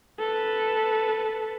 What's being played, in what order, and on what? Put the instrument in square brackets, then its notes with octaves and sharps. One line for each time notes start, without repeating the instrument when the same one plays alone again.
[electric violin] A4 B4